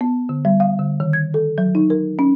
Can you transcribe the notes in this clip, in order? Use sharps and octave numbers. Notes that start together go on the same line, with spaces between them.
B3
D3
G3
F5
D3
D#3
G#6
A4
F#3
D#4
A#4
C#4